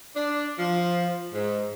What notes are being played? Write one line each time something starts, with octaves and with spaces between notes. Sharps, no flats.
D4
F3
G#2